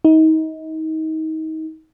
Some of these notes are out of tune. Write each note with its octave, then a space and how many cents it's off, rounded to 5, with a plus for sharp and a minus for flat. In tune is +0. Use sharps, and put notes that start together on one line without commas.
D#4 +30